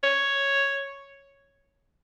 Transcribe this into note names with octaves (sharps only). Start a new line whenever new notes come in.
C#5